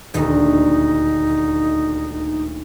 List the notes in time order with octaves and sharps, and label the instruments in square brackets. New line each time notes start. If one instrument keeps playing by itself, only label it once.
[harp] D#1 D2 [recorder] D#4